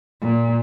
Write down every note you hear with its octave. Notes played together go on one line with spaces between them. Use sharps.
A#2